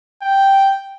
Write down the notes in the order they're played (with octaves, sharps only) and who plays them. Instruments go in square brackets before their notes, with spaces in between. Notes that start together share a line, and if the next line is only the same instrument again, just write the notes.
[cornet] G5